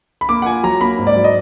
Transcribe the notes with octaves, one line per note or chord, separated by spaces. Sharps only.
B5
A#3 D6
F#5
F4 G#5
F#3 A#5
A#3 B5
G#2
D5
F#3
D#5